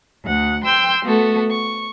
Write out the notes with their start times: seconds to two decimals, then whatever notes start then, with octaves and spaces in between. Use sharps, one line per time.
0.24 D2 F#5
0.64 G5 C6 E6 G6
1.05 A3 B3 F#4 A4
1.51 C#6